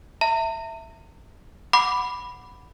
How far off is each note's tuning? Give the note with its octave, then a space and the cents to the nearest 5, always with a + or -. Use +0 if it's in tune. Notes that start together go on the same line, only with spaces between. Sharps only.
E5 +0 A#5 -45
F#5 -5 B5 +0 D6 +0